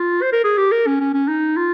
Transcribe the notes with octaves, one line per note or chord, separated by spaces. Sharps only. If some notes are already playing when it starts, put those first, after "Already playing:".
Already playing: F4
C5
A#4
G#4
G4
A#4
C#4
C#4
C#4
D#4
F4